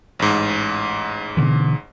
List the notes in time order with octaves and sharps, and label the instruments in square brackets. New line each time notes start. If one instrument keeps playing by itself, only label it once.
[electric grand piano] A1 G#2
[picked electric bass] B2 D3 E3